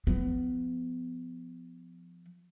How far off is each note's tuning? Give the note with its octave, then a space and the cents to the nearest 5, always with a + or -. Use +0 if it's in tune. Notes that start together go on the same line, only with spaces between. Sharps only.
F3 +0 B3 +30